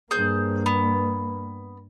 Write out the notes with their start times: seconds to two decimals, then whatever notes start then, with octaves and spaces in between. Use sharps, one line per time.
0.11 G2 A#3 G#4 C5 G6
0.66 B3